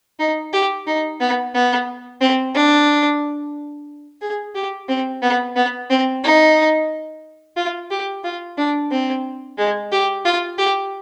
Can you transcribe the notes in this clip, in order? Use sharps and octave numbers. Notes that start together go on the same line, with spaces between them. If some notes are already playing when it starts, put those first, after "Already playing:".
D#4
G4
D#4
B3
B3
C4
D4
G#4
G4
C4
B3
B3
C4
D#4
F4
G4
F4
D4
C4
G#3
G4
F4
G4